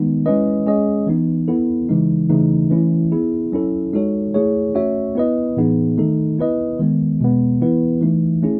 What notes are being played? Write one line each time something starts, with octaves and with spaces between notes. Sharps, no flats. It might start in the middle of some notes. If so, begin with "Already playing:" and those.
Already playing: D#3 G#3 B3 D#4
G#3 C#4 E4 B4 D#5
G#3 C#4 G#4 D#5
E3 B3 D#4
B3 E4 A4
C#3 E3 G#3 D#4
C#3 E3 A3 D#4
E3 A3 C#4 E4
B3 E4 G#4
F#3 C#4 E4 A4
G#3 D#4 F#4 A4 C#5
A3 E4 G#4 C#5
A3 C#4 F#4 C#5 E5
B3 E4 B4 D#5
A2 E3 B3 D#4 G#4
D#3 A3 D#4 A4
B3 E4 B4 D#5
D#3 G#3 B3
B2 G#3 B3
E3 B3 E4 B4
E3 A3 D#4
A3 C#4 E4 G#4